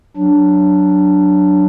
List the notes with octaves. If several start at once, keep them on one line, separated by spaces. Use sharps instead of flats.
F#3 D4